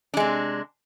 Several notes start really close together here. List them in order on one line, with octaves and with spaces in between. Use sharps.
D4 G#3 C3